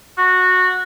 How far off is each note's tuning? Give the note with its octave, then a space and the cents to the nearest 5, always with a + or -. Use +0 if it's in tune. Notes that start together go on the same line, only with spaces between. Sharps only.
F#4 -15